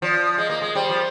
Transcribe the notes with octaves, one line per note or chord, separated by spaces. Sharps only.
F3 D5
G#3 D#5
A#3
G#3
G3 C5
F3